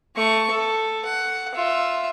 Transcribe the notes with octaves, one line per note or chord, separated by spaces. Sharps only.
A3 C#6
A4
F#5
F4 E5